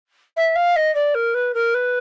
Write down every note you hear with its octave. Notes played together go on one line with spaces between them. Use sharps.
E5
F5
D#5
D5
A#4
B4
A#4
B4